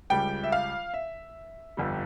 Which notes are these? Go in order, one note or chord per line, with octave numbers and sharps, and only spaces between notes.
C#2 C#3 G3 G5
E5
F5
E5
G1 F2 D3 G3